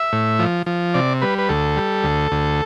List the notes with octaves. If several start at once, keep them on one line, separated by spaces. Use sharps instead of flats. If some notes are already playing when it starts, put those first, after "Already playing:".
Already playing: E5
A2
F3
F3
C3 D5
G3 B4
B4
D2 A4
G3
D2
D2